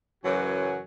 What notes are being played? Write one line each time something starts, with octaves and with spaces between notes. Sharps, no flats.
F#2 C#3 E3 F#3 F#4 G#5